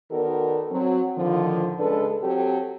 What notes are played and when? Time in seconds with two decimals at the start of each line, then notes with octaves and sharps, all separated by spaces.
0.11 D#3 B3 F#4 A4 A#4 D5
0.71 F#3 C4
1.17 A2 D3 D#3 F3
1.79 C#3 G#3 D4 A4 B4
2.22 F#3 C4 G4 A4